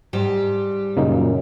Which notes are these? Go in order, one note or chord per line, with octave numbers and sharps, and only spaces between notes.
G#2 G3 G4
F#2 A#2 C#3 A#3 D#4